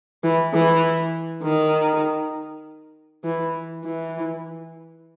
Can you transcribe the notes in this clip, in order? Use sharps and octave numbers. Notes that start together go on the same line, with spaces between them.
E3
E3
D#3
E3
E3